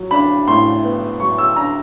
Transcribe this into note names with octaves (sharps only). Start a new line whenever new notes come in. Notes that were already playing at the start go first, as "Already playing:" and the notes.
Already playing: F#3
D4 B5
A2 C6
B3
F#3 C#6
E6
D4 A#5